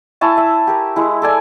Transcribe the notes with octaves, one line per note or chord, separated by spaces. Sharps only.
E4 G#5 A5 C#6
E5
G4 A#4
G#3 E4
A4 D5 G#5